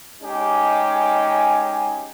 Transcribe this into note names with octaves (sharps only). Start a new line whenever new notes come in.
G#3 C#4 D#4 G4 G#4